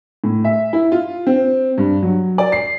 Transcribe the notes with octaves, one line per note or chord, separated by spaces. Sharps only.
A2
E5
E4
F4
C4
G2
F#3
D5
C7